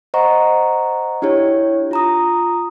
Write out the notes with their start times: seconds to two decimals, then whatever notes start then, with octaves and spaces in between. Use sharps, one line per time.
0.14 C5 D#5 F#5 A#5 C#6
1.22 D4 E4 G4 C#5
1.91 F4 A#5 D#6